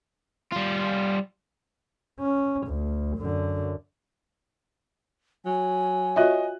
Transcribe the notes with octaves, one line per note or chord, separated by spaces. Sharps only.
G3 F4
C#4
D2
F#2 D3
F#3 G#5
F4 F#4 C#5 D#5 E5 F#6